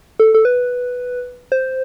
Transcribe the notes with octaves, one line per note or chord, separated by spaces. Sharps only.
A4
A4
B4
C5